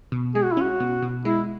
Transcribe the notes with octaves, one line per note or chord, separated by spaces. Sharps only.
B2
G#3 G#4
F#4
E4
C#4 F#4
B2
B2
G#3 E4